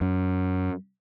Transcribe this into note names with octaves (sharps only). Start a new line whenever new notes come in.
F#2